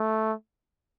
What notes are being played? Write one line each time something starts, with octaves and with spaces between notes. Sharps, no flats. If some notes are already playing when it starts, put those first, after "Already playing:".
Already playing: A3